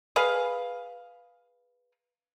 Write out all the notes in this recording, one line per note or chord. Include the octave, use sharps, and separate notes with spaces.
G#4 B4 F5